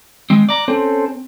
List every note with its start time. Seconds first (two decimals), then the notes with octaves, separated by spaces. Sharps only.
0.30 D#3 G#3 C4
0.49 D5 A#5 F#6
0.68 C4 C#4 A4 C5